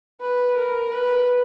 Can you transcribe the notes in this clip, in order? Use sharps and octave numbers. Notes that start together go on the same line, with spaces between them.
B4
A#4
B4